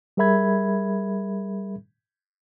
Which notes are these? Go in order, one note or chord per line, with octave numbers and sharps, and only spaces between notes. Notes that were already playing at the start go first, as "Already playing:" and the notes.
G3 G#4 A#4 E5 B5 G#6